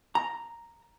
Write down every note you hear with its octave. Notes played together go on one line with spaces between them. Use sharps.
A#5